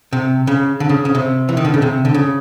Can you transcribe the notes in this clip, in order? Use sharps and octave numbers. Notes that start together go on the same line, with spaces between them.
C3
C#3
D3
C#3
C#3
C3
E3
D#3
D3
C#3
C3
D3
C#3